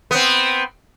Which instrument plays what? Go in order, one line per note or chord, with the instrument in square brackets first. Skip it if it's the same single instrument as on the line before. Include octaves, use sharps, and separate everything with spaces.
[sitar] B3 C4